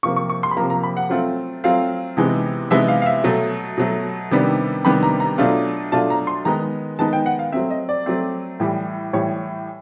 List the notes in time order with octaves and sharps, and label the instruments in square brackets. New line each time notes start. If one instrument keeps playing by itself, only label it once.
[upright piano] C3 F3 A#3 C#6
C#6
C#6
C6
B5
C3 F3 A#3 A#5
A#5
B5
F#5
F#3 A3 C4 F4
F#3 A3 C4 F4 F5
C3 E3 G#3 B3 D#4
C3 E3 G#3 B3 D#4 E5
F5
F5
E5
B2 F#3 A3
B2 F#3 A3
C3 D#3 G3 B3 D4
C3 D#3 G3 B3 D4 B5
A#5
A#5
B2 F#3 A3 D4 F4
B2 F#3 A3 D4 F4 A5
A#5
C6
D#3 G#3 B3 D#4 A#5
D#3 G#3 B3 D#4 A5
G5
F#5
F5
F#3 A3 C4 E5
D#5
D5
F#3 A3 C4
A2 E3 G3
A2 E3 G3 C#5